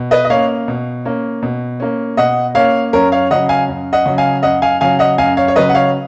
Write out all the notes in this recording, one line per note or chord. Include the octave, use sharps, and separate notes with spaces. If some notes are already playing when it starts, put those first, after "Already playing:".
Already playing: B2
B4 D#5
D#5
A#3 C#4 C#5 F5
B2
A#3 C#4
B2
A#3 C#4
B2 D#5 F#5
A#3 C#4 C#5 F5
F#2 A#4 C#5
C#5 F5
C#3 F#3 D#5 F#5
F5 G#5
F#2
D#5 F#5
C#3 F#3
F5 G#5
F#2 D#5 F#5
F5 G#5
C#3 F#3 F5 G#5
D#5 F#5
F#2 F5 G#5
C#5 F5
C#5
C#3 F#3 B4 D#5
F#5
C#5 F5